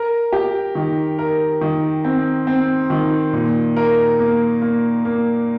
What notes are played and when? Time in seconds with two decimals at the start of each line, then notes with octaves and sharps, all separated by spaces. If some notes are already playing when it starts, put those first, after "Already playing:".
Already playing: A#4
0.33 G4
0.75 D#3
1.19 A#4
1.61 D#3
2.04 C4
2.47 C4
2.90 D#3
3.33 A#2
3.76 A#4
4.20 A#3
4.62 A#3
5.05 A#3